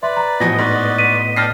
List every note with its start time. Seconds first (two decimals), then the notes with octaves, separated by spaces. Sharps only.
0.03 B4 D5 E5 C6
0.17 A#5
0.40 A2 E3 F3 B3 F#4 D#5 A#6
0.59 G#2 F#4 D5
0.98 B6 D#7
1.36 D5 G5 A5 F6 A#6 C7